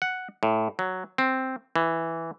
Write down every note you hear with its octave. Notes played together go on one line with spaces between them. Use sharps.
F#5
A2
F#3
C4
E3